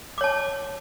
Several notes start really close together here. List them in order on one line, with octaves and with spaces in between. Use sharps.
D6 C#5 A5